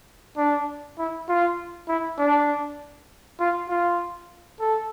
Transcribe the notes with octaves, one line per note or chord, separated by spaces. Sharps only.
D4
E4
F4
E4
D4
F4
F4
A4